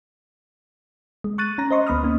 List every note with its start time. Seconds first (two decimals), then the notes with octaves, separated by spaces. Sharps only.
1.24 G#3
1.38 C#6 F#6 A6 D#7
1.58 C#4 A#5 A#6
1.71 C5 D#5 C6 C#6
1.87 D2 B3 B5 D#6 F6
2.03 A#3 C#4